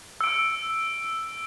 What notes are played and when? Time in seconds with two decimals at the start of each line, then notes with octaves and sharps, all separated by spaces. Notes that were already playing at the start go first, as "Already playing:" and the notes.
0.21 E6 D7